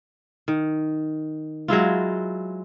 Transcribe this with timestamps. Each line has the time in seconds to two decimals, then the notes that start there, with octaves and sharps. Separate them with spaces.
0.48 D#3
1.68 F#3 G#3 E4 F4